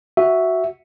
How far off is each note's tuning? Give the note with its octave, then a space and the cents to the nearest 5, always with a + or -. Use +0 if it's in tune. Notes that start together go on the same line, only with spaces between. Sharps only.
F#4 +5 E5 +0